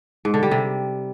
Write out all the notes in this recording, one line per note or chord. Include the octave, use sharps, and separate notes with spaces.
G#2
D3
G3
C3